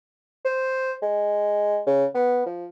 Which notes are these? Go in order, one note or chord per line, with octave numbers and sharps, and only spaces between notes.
C5
G#3
C#3
B3
F3